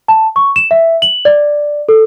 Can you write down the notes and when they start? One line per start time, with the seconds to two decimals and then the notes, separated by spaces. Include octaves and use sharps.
0.08 A5
0.36 C#6
0.56 E7
0.71 E5
1.02 F#7
1.25 D5
1.89 A4